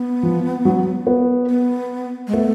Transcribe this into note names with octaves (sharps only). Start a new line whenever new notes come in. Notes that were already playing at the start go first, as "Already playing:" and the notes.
Already playing: B3
F3
F#3
B3
B3
G#3
A3 B3